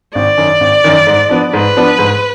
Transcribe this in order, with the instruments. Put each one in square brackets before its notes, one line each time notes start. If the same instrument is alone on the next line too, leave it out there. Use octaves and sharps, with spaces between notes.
[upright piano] G#1 [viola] D5
[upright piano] F#2 D#3
G#1
F#2 D#3
G#2
F3 B3 D4
[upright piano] G#2 [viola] B4
[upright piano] F3 B3 D4
G#2